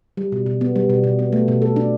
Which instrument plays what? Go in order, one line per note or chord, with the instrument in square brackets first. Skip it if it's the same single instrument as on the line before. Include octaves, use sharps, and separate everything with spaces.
[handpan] G3
B2
B2
B3
G3
B2
B2
B3
A3
B2
A4
D4